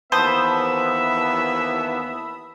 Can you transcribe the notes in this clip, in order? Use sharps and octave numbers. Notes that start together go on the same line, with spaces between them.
D#2 E3 B3 C5 E5 A5 B5 D#6